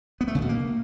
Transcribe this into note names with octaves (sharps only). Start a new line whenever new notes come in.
B3
A3
C#3
B2
A#3